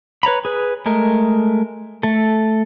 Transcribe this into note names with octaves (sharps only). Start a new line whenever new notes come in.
B4 C#5 A#5 B5
G#4 B4
G#3 A3 A#4
A3 A4